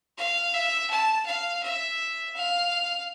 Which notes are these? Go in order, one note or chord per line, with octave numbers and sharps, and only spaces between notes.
F5
E5
A5
F5
E5
F5